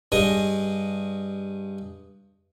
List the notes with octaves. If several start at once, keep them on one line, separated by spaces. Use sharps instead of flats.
G2 G#4 D#5 G#5